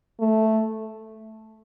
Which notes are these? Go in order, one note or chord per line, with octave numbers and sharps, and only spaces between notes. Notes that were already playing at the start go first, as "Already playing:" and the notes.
A3